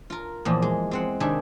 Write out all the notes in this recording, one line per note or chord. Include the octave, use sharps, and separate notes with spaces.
F4 A#4
E2 A#2 F3
G#3
G#3 C4 F#5
C3 D#3 D4 E5 G#5